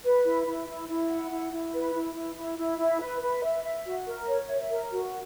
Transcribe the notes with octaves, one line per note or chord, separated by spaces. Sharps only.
B4
E4
E4
E4
E4
F#5
E4
E4
B4
E4
E4
E4
E4
E4
B4
B4
E5
E5
F#4
A#4
C#5
E5
A#4
F#4